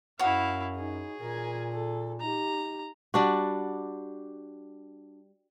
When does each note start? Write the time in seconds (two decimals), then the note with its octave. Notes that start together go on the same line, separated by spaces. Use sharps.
0.19 F#2 E4 F#4 C#5 F5
0.76 D#4 G#4
1.20 A#2 A#4 G#5
1.73 A4
2.21 D#4 G4 A#5
3.14 G3 D4 F#4